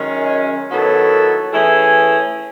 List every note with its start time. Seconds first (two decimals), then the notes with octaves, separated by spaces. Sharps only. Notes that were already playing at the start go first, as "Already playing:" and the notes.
Already playing: F#2 D#3 G#3 C#4
0.70 D#3 F#3 B3 E4 A4
1.53 E3 A3 C#4 E4 G#4